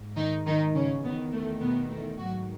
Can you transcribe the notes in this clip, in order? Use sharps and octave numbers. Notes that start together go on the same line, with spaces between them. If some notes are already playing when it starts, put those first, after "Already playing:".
Already playing: G#2
D#3 D#4
D#3 D#4
C#3 C#4
E2 B2 D#3 B3
A3
B2 B3
A3
G#2 D#3 F#3 F#4